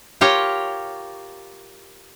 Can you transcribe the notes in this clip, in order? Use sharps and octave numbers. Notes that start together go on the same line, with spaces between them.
F4 G4 A#4 C#5 F5